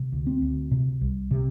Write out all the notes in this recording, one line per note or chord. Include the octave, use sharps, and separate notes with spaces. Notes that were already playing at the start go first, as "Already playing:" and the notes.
Already playing: C3
D2
C4
D2
C3
C2
C3